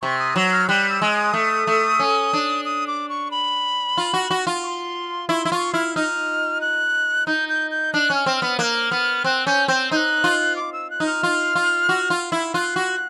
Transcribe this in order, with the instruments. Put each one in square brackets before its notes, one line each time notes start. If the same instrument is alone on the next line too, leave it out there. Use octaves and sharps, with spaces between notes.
[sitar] C3 [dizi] C#6
[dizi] D#6
[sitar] F#3
[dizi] F6
[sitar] G3 [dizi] F#6
[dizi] E6
[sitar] G#3
[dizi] D#6
[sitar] A3
A3
C#4
D4
[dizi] D#6
D6
C#6
B5
[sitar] F4
F#4
F#4
F4
[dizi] C#6
C6
[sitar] E4 [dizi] C#6
[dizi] C6
[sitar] E4
[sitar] F4 [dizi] C#6
[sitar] E4 [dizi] F6
[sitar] D#4 [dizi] F6
[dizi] F#6
[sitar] D#4 [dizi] G6
[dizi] G6
G6
[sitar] D4 [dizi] F#6
[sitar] C#4 [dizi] F6
[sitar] C4
[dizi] F6
[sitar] B3
[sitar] A#3 [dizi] F#6
[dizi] F6
[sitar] B3
[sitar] C4 [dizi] F#6
[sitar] C#4 [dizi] G6
[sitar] C4 [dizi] G6
[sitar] D#4 [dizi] F#6 G6
[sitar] F4
[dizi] D6
E6
F#6
[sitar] D#4
[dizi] F6
[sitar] F4
F4
F#4
F4
E4
[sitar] F4 [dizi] F#6
[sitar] F#4